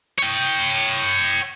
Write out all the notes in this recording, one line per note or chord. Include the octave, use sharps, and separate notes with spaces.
C#5 G5